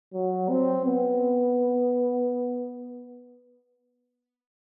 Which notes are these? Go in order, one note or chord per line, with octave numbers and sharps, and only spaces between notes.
F#3
C4
B3